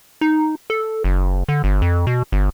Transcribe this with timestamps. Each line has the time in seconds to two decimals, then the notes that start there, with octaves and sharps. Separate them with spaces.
0.21 D#4
0.70 A4
1.04 F#1
1.48 D3
1.64 G1
1.82 F2
2.07 B2
2.32 G1